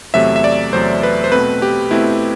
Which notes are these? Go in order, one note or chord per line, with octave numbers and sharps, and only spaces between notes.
E2 C3 F#3 A3 E5
E5
D5
E2 C3 F#3 A3 C5
B4
C5
B2 A3 C4 B4
G4
B2 A3 C4 E4